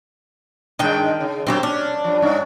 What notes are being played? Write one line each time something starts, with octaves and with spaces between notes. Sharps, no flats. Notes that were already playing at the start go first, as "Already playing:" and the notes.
G2 D#3 G#3 D4 G5
C#3
F#2 F#3 A#3 C4 F#4 G4
C#4 D4
G2 F3
G2 C#4 D4